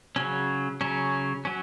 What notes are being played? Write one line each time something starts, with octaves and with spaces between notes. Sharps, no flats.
C#3 F#3 C#4
C#3 F#3 C#4
F#3 C#4